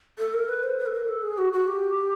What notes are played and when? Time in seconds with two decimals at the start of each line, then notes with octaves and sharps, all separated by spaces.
0.19 A4
0.34 A#4
0.49 B4
0.63 C5
0.79 B4
0.86 A4
0.93 A#4
1.08 A4
1.23 G#4
1.38 F#4
1.53 F#4
1.68 G4